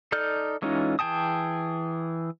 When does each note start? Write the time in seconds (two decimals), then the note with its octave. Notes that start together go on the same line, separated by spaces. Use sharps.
0.12 D#4 A4 D5 F6 G6
0.62 E3 G#3 C#4 D#4 F4
0.99 E3 G#4 G5 A5 D#6